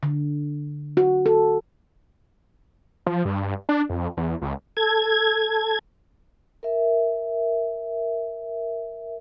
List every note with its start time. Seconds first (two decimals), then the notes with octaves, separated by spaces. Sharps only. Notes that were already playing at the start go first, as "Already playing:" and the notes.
0.03 D3
0.97 F#4
1.26 A4
3.06 F3
3.25 G2
3.69 D4
3.89 F2
4.17 E2
4.42 C#2
4.77 A4 G#6
6.63 A#4 E5